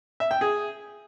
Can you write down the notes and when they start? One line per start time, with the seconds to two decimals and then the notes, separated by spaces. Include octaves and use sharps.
0.20 E5
0.31 G5
0.41 G#4